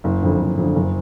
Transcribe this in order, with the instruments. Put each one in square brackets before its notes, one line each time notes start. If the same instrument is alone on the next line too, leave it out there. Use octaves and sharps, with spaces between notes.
[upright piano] F#1
F2 D3
F#1
F2 D3
F#1